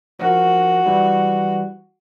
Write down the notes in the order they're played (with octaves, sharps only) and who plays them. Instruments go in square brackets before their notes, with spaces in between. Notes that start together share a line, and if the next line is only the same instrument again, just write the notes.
[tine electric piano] F3 A#4 [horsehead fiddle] F#4
[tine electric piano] E3 G3